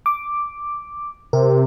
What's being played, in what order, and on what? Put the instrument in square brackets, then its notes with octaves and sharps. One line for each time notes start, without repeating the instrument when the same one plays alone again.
[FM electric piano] D6
[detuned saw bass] C3 [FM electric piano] A#4